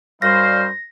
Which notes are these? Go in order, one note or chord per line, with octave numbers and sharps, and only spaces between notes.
F#2 G3 C#4 D#4 C5 F5 A#6